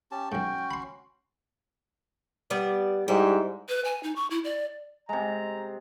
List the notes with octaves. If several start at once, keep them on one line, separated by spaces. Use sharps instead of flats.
C#4 G4 A5
B1 G#2 C#4 F#4 G5
B5 C6
G3 B3 D5
G#2 G3 E4
B4
G#5
D#4
C#6
E4
D5
C3 G#3 A#5